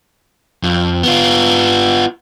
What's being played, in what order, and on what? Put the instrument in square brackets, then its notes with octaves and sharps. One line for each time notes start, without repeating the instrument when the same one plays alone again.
[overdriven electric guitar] F2
B3 F4